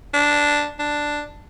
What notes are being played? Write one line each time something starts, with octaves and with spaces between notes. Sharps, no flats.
D4
D4